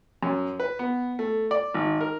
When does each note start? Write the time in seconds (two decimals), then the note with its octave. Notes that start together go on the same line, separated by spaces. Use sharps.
0.23 F#2
0.60 B4
0.79 B3
1.19 A3
1.51 D5
1.74 G#1
2.01 A#4